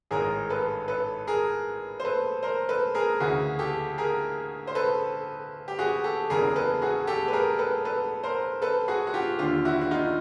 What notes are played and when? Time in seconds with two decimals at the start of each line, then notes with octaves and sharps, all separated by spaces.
0.11 A1 G#2 D#3 G#4 A#4
0.49 A4 B4
0.88 A4 B4
1.27 G#4 A#4
2.00 C5
2.04 A4 B4
2.43 A#4 C5
2.69 A4 B4
2.95 G#4 A#4
3.20 D2 C#3 E3 F#4 G#4
3.59 G4 A4
3.98 G#4 A#4
4.67 C5
4.75 A4 B4
5.68 G4
5.79 F#4 G#4
6.04 G4 A4
6.30 F#1 E2 C#3 E3 G#4 A#4
6.56 A4 B4
6.81 F#4 G#4
7.07 G4 A4
7.28 B4
7.33 G#4 A#4
7.59 A4 B4
7.85 A4 B4
8.23 A#4 C5
8.62 A4 B4
8.88 F#4 G#4
9.07 F#4
9.14 F4 G4
9.39 D#2 D3 F4 G4
9.65 E4 F#4
9.81 F#4
9.91 D#4 F4